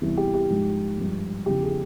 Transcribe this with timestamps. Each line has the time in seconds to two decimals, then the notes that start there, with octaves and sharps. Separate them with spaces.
0.01 E2 C3 E3 G3
0.17 G4
0.34 G4
0.50 G#2 F3 G#3
0.97 G2 F3 G#3
1.46 E2 C#3 F3 G4
1.62 G#4